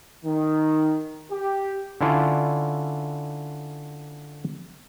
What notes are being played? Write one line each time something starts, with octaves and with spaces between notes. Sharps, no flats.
D#3
G4
D3 C#4 E4 F4 D5